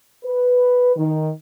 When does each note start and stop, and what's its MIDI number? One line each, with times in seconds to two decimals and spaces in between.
0.24 0.95 71
0.96 1.29 51